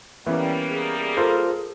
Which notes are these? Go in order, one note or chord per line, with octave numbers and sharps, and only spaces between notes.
E3 G3 A#3 B3 C#4
G#4
F4 A4 A#4 C5